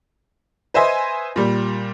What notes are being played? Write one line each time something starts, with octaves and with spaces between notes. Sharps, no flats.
B4 C5 D#5 E5 G#5
A#2 G3